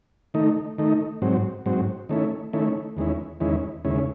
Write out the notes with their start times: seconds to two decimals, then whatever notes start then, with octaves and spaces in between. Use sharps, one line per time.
0.34 D#3 A3 D#4
0.78 D#3 A3 D#4
1.22 G#2 F#3 C4
1.66 G#2 F#3 C4
2.09 D#3 A3 C#4 E4
2.53 D#3 A3 C#4 E4
2.97 E2 D#3 G#3 C#4 E4
3.40 E2 D#3 G#3 C#4 E4
3.85 D#2 C#3 G#3 C#4 E4